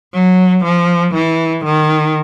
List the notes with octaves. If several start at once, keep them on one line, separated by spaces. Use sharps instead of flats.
F#3
F3
E3
D#3